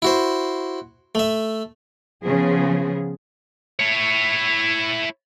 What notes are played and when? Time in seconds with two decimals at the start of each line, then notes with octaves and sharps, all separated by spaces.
0.02 E4 F#4 C5
1.15 A3 E5
2.24 C#3 F3 B3 G#4
3.80 E4 C#5